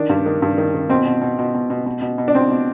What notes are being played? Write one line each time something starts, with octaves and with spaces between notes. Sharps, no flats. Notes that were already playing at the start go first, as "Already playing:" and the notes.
Already playing: D#3 D4
G2
D#3
G2
D#3
D#3
B2 C4
B2
B2
B2
B2
B2
B2
B2
B2
D4
B2 C4
B2